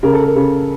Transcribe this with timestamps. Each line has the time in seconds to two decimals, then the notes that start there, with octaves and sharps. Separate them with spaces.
0.03 C#3 A#4
0.13 A4
0.24 A#4
0.36 C#3